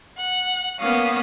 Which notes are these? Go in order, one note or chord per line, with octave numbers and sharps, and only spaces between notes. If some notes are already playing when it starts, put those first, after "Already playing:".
F#5
A#3 B3 C#4 F5 D#6